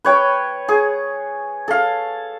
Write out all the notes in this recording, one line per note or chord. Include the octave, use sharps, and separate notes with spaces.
B4 C#5 G5
G#4
A4 F5